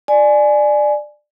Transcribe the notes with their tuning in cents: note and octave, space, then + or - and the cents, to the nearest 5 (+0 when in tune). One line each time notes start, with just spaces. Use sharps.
D5 +15 G#5 +15